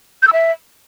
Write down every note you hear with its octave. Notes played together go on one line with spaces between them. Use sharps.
G6
E6
E5